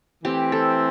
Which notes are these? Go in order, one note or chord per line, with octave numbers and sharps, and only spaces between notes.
E3 A3 C4 G4
A4